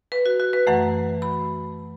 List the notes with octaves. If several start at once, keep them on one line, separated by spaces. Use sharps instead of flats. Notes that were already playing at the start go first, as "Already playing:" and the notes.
B4
F#4
F#4
B4
F#2 E3 A3 F#5
B5